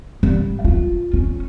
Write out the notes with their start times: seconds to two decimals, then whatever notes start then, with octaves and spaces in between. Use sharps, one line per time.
0.23 G3
0.65 F4
1.14 C#4